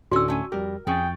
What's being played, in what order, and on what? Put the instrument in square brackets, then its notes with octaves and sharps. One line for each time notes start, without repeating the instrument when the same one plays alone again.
[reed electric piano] D2 A2 D3 [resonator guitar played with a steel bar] C#4 D5 [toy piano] F#4 E6
[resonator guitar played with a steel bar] A3 C#4 G#5
[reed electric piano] F2 G3 G4 [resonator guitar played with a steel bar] A#4
[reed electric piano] F2 C#6 A6 [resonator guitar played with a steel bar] C#4 G#4 [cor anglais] G5